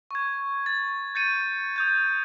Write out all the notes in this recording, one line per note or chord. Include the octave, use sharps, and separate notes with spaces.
C#6 G#6
A6
G6 A6 C#7 D#7
D#6 G6 G#6